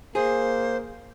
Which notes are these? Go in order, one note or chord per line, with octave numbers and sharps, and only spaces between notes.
A#3 G#4 C5